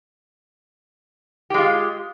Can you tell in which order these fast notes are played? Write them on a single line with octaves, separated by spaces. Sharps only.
G4 G#3 F4